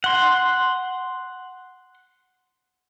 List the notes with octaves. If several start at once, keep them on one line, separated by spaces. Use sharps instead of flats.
F#5 C6